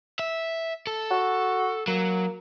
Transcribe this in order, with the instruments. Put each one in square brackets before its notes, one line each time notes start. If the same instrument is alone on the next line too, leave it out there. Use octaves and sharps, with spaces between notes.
[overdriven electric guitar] E5
A4
[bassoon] F#4
[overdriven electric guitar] F#3 [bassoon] A#3